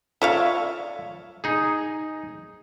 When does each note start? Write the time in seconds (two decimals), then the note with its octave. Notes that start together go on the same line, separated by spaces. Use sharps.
0.22 F4 C#5 D5 E5 F5
1.44 D#4 G#4